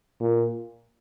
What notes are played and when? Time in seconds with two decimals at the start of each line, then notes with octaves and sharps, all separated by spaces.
0.21 A#2